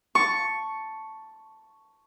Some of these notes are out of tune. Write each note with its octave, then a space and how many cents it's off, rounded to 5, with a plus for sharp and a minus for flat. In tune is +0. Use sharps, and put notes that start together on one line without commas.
A5 +0 C#6 +0